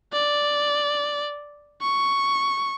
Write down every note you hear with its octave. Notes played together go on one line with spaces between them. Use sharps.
D5
C#6